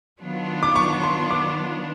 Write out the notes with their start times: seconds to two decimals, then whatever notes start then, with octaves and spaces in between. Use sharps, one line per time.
0.20 D#3 F#3 B3 D4 F4
0.63 D6
0.76 C#6
1.03 C6
1.31 D6